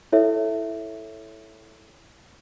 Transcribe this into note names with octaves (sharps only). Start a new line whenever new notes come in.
E4 A4 C#5 E5